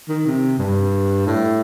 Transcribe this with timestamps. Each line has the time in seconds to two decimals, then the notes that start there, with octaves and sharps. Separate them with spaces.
0.09 D#3
0.26 C3
0.59 G2
1.26 A2